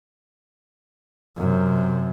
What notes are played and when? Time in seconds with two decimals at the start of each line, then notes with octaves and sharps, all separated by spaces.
1.37 F#2 C3